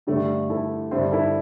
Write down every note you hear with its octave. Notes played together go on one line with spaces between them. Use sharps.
G2 D3 A3 D4 G4
E4 A4
G2 D3 G3 D4 C5 E5
E4 A4